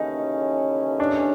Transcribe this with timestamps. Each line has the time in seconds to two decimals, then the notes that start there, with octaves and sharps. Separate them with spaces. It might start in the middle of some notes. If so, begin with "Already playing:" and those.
Already playing: D#2 C#3 E3 A3 C#4 D#4
1.00 D4